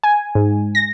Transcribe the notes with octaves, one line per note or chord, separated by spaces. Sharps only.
G#5
G#2
A#6